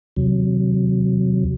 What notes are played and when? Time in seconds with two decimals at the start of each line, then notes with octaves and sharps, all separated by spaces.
0.17 D#2 C3 F#3